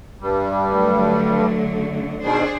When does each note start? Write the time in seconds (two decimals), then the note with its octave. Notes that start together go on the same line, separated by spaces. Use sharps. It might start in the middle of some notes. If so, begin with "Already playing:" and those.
0.21 G2 G3
0.68 D3 F#3 A3
2.23 B2 D#3 D4 G#4 C5